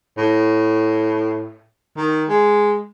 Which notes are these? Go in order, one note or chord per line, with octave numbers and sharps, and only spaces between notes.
A2
D#3
G#3